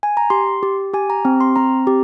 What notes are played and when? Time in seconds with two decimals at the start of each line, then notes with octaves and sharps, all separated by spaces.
0.03 G#5
0.17 A#5
0.30 G4 C6
0.63 G4
0.93 G4 G#5
1.10 A#5
1.25 C4
1.41 C6
1.56 C4 A#5
1.87 G4